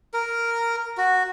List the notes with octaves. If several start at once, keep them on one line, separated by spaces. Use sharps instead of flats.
A#4
F#4